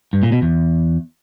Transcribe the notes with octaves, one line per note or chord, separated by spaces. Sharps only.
G2
A#2
B2
E2